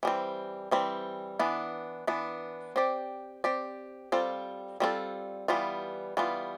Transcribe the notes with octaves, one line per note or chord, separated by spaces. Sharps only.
E3 G3 C4
E3 G3 C4
E3 B3 D4
E3 B3 D4
C4 G4 D5
C4 G4 D5
G3 C4 F4 A4
G3 C4 F4 A4
E3 G3 B3 F4
E3 G3 B3 F4